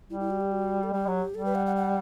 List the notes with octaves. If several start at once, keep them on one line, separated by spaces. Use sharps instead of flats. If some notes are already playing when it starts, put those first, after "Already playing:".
G3 E4
E4
F#4
G4
F#4
A4
G3 G4
F#3
G3 A4
B4
F#5
F#5
F#5